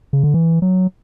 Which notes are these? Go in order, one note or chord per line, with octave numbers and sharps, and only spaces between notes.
C#3
D3
E3
F#3